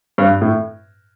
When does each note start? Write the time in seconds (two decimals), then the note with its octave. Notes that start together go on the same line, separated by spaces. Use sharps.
0.18 G2
0.42 A2